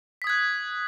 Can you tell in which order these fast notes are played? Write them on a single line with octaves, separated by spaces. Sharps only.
B6 D#6 G#6 F#6